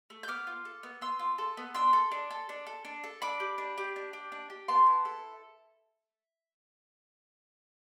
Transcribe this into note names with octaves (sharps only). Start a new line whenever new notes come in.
A3
G6
B3 D6 F6
F4
A4
B3
B3 C6 E6
F4
A4
B3
D4 C6 E6
A4
D4
A4
D4
A4
D4
A4
D4 B5 D6
G4
D4
G4
D4
G4
D4
G4
B3 A5 C6
E4
A4